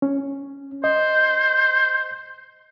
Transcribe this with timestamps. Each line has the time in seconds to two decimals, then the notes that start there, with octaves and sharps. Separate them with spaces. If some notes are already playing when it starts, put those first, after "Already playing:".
0.02 C#4
0.84 C5 D#5